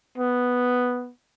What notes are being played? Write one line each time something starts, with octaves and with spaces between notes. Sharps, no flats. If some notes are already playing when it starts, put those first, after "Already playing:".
B3